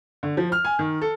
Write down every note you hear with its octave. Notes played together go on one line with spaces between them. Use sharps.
D3
F3
F6
G#5
D#3
A4